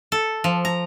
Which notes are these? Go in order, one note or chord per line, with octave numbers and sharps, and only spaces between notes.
A4
F3
A#5